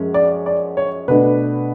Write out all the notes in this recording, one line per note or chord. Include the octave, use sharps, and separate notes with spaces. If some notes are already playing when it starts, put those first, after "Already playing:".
Already playing: F#2 F3 G#3 C#4
D5
D5
C#5
B2 A3 D4 B4